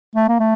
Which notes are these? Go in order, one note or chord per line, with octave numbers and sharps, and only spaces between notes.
A3
A#3
A3